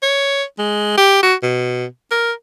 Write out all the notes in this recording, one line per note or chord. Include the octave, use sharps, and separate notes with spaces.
C#5
G#3
G4
F#4
B2
A#4